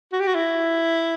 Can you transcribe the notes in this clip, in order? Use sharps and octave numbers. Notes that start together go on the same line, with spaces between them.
F#4
G4
F#4
E4